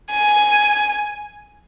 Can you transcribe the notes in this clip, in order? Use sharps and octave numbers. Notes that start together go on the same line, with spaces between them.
G#5